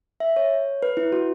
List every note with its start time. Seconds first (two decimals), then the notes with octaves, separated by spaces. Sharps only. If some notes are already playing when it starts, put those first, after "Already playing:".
0.20 E5
0.36 C#5
0.83 B4
0.97 E4
1.12 F#4